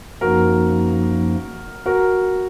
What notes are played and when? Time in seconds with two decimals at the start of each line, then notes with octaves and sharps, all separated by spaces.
0.21 F#2 F3 A#3 D#4 F#4 A#4
1.86 F#4 A#4